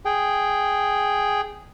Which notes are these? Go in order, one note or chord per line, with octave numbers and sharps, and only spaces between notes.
G#4 G5